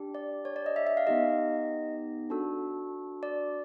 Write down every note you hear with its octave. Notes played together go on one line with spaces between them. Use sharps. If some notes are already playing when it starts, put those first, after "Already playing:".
Already playing: D4 G4
D5
C#5
D5
D#5
E5
E5
F5
B3 D#4 G4 D#5
D4 F#4 A4
D5